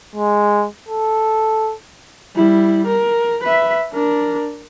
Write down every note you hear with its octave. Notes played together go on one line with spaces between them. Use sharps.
G#3
A4
G3 E4
A#4
B4 E5
D4 A#4